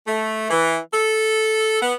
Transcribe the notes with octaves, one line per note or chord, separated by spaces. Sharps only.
A3
E3
A4
B3